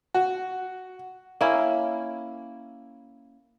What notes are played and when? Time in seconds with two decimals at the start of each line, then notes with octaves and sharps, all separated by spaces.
0.14 F#4
1.41 A#3 C#4 E4